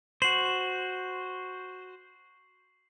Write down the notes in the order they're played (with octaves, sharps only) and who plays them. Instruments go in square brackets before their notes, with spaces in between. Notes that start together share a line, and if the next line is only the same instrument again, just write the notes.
[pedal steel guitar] F#4 C5 [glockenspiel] C7 F#7